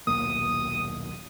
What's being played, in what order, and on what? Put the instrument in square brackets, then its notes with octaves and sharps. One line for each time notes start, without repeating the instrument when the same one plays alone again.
[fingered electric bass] D#1 B1 A#3 [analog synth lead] D#6